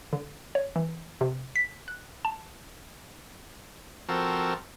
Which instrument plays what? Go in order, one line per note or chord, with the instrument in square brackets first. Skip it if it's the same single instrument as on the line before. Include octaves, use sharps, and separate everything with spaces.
[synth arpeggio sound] D3
C#5
E3
C3
B6
F#6
A5
[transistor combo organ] F3 C4 F#4 A4 A#4